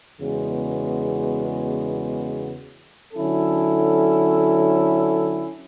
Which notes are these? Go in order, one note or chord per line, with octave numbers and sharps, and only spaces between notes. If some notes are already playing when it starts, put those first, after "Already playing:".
E2 C#3 G#3 B3 F#4
D3 F#3 C#4 E4 A4